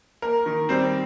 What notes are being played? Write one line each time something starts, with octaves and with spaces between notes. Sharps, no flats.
A#3 A#4
D#3
G3 C4 C5